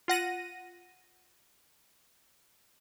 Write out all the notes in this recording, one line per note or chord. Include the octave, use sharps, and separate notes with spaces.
F4 F#5 A#6 D#7